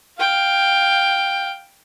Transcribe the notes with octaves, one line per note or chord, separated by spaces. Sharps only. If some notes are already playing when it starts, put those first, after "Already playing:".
F5 G5